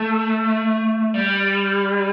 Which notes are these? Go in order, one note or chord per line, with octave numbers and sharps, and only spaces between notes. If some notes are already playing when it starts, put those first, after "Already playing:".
Already playing: A3
G3